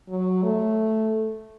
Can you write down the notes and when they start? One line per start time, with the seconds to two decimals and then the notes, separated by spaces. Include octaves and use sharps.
0.09 F#3
0.43 A3